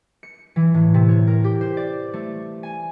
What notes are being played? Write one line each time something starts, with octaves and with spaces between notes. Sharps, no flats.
C#7
E3
A2
C3
C#5
A#4
G4
C5
D5
A3
G#5